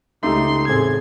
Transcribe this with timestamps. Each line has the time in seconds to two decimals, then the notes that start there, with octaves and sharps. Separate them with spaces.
0.23 C#2 A3 D#4 G4 C6
0.68 E2 A2 C4 G#4 A4 G#6